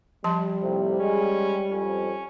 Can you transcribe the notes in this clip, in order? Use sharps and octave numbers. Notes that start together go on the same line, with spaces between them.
F3 G3 A5 C6
F2 A2 C3
G#3 C#4
F2 C#4